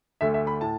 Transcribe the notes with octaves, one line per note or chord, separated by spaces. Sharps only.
D2 D3 A3 E5
E5
B5
A2 A5